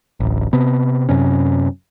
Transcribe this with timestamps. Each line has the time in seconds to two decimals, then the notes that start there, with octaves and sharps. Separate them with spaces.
0.20 D1 A1
0.53 C3 B3
1.09 F#2 C3 C#4